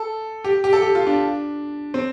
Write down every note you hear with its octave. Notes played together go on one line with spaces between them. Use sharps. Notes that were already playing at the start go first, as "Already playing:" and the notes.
Already playing: A4
G4
G4
A4
G4
F4
D4
C4